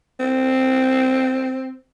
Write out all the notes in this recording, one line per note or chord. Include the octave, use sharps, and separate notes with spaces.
C4